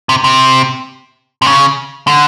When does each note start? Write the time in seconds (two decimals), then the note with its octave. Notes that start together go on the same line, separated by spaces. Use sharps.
0.09 C3
0.24 C3
1.42 C3
1.46 C#3
2.07 D3